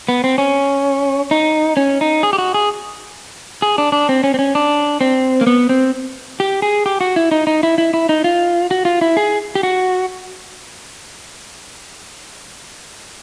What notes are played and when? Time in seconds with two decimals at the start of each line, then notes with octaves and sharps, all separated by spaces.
0.09 B3
0.24 C4
0.38 C#4
1.31 D#4
1.77 C#4
2.01 D#4
2.23 G#4
2.33 G4
2.38 F#4
2.54 G#4
3.62 G#4
3.78 D4
3.92 D4
4.09 C4
4.24 C#4
4.34 C4
4.39 C#4
4.55 D4
5.01 C4
5.41 A#3
5.47 B3
5.69 C4
6.40 G4
6.62 G#4
6.86 G4
7.01 F#4
7.16 E4
7.31 D#4
7.47 D#4
7.63 E4
7.78 E4
7.94 E4
8.09 D#4
8.24 F4
8.71 F#4
8.85 F4
9.01 E4
9.17 G#4
9.55 G4
9.63 F#4